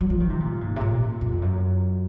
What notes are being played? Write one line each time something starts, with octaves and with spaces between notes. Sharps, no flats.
F#3
F3
D#3
C3
A#2
G#2
C3
A#2
F2
F#2